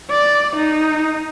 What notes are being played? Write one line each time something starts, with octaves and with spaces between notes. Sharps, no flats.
D5
D#4